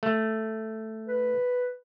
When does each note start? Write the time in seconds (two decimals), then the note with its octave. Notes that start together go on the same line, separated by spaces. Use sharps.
0.03 A3
1.07 B4